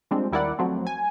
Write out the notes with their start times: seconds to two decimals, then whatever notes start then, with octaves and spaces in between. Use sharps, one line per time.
0.11 F3 G3 G#3 C4 D4
0.32 D#2 G3 E4 A#4 D5 F#5
0.59 F3 F#3 A3 C4
0.87 G#5